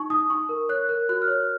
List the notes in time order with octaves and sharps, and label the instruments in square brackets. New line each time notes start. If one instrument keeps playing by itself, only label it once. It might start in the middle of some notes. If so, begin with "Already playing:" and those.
Already playing: [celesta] D#4 C#6
D#4 D#6
D#4 C#6
A#4
C#5 F#6
A#4 F#6
F#4 F#6
F6
C#5